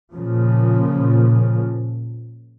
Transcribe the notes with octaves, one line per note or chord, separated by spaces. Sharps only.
A#2 C#3 F3